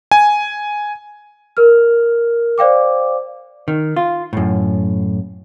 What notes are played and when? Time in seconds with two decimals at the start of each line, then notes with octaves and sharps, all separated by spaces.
0.11 G#5
1.57 A#4 F6
2.58 C5 D5 F5 G5 D6
3.68 D#3
3.96 F4
4.33 F#2 A2